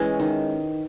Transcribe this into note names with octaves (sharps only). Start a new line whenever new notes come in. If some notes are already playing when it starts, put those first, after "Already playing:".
Already playing: E3 G#3 C#4
D#3